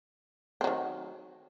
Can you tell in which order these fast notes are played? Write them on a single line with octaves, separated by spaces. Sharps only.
C4 F#3 D#3